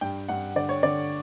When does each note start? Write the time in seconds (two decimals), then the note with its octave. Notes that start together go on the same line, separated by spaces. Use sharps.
0.01 G2 G5
0.28 G2 F#5
0.55 D3 D5
0.69 C#5
0.83 D3 D5